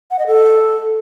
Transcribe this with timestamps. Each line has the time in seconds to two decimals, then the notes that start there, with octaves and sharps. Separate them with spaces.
0.11 F#5
0.19 D#5
0.27 A4